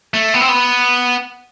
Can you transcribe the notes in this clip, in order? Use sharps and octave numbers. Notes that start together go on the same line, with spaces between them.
A3
B3
C4
B3